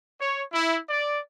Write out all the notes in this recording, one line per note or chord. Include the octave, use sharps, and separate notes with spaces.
C#5
E4
D5